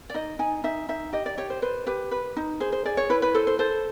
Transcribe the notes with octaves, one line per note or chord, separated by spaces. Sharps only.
D5
D#4 D#5
D#4 G#5
D#4 E5
D#4 E5
G4 D#5
D5
G4 C#5
C5
B4 C5
G4 B4
B4
D#4
G#4 C5
C5
G#4 D5
C#5
E4 B4
B4
A4 C5
C5
A4 C5